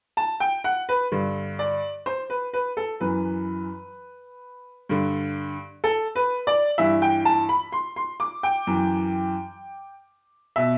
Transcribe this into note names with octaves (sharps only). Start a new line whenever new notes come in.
A5
G5
F#5
B4
G2 D3
D5
C5
B4
B4
A4
F#2 E3 B4
G2 D3
A4
B4
D5
G2 E3 E5
G5
A5
B5
C6
C6
D6
G5
F#2 E3
B2 E5